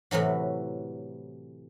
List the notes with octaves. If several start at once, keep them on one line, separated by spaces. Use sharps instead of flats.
A2 C3 E3 F#3